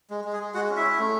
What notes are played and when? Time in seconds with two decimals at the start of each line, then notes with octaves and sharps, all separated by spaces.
0.10 G#3
0.25 G#3
0.33 G#4
0.40 G#3
0.54 G#3 F#4 F#5
0.70 C#4
0.76 E4 E5
0.84 C#4
0.99 A3